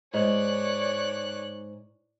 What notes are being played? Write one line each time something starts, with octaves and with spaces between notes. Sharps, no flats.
G#2 C#5 D5 F#6